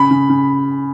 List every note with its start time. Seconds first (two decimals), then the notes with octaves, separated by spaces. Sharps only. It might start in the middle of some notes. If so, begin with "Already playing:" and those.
Already playing: C#3 B5
0.11 C#3
0.29 C#3